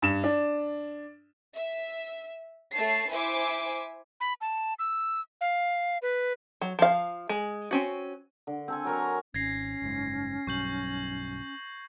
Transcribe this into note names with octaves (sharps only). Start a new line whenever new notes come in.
G2 E7
D4
E5
A3 C#5 A5 C7
E4 C5 E5 G#5 D6
B5
A5
E6
F5
B4
F#3
F3 F5
G#3
C4 C#4 F#4
D3
C4 A4 G#5
F#3 A#4 C#5
G#1 C#4 G#6 A#6 C7
F#1 G#2
B1 G2 F#3 C#6 G6 F#7